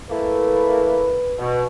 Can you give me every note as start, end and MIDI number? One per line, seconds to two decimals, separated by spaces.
0.10 1.20 57
0.10 1.20 58
0.10 1.20 64
0.10 1.44 71
1.38 1.65 47